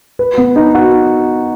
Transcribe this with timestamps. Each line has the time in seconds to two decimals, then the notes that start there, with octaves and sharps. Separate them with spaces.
0.19 B4
0.38 B3
0.56 D#4
0.75 F#4